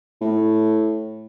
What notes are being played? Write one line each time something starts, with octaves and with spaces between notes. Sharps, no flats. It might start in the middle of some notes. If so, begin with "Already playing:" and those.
A2